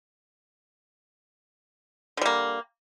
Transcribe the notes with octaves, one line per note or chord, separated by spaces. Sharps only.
D3 G3 A#3